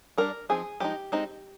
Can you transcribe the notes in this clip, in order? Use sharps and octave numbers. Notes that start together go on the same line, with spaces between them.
G3 D4 A#4
F3 C4 D#4 G#4
F3 G#3 D#4 G4
G#3 C4 D#4